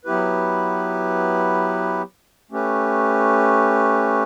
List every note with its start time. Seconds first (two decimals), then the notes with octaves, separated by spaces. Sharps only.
0.05 F#3 B3 E4 G4 B4
2.51 A3 C#4 G4 B4